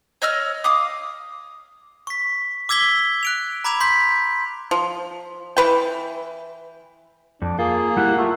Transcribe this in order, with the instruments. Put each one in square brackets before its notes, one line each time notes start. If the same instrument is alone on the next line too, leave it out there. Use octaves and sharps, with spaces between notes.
[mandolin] C#5 D#5 E6 F6
F5 D6 D#6
[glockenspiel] C#6 B6
D6 E6 G#6 B6 G7
F#6 D7 F7
A#5 B5 D6 G#6 F7
C6 G6 B6
[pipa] F3
E3 B4 G5
[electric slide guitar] F2 [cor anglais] D4
[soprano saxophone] A#3 [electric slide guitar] F4 [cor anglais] G#4
[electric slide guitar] G3 E4 G4 [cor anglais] F#5
[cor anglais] A3 [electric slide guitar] F4